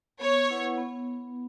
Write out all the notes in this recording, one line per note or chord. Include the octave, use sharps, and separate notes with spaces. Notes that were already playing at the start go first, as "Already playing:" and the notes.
B3 C#5
E4 B4 F#5
B3